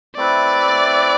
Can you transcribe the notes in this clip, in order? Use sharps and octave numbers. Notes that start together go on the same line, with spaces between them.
A3 C4 E4 B4 D5